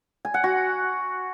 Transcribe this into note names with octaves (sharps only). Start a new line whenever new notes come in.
G#5
F#5
F#4